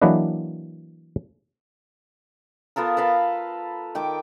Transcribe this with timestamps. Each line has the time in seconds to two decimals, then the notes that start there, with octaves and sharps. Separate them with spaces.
0.02 E3 F#3 A#3 D4 B4 D#5
2.76 B3 F4 A4 A#4
2.97 A4 B4 F5 A#5
3.95 D#3 G5 D6